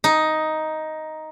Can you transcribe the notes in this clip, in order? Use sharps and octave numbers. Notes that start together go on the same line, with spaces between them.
D#4